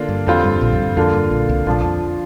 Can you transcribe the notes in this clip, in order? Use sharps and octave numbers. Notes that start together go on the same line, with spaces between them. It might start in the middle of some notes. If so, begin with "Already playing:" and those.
Already playing: D3 A#3 D4 F4
G2
F2 D3 G3 C4 F4
G2
A#1 A#2
F2
G2
F2 D3 A#3 D4 F4
G2
A#1 A#2
C2 C3
A#1 A#2 F3 D4 F4
F2